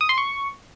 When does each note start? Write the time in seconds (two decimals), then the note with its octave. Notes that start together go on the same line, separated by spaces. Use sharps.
0.01 D#6
0.09 C6
0.18 C#6